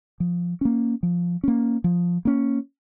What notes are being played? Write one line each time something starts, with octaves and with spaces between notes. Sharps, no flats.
F3
A#3 C#4
F3
A#3 C#4
F3
A#3 C#4